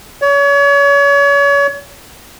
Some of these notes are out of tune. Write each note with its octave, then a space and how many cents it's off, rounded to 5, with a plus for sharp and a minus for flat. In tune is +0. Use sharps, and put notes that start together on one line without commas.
C#5 +35